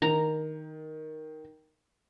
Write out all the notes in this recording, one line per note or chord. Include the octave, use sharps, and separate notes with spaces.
D#3 A#5